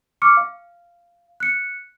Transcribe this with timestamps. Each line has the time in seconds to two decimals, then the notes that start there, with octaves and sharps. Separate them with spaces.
0.22 C#6 D6 F6 C#7
0.37 F5
1.40 F#6 C#7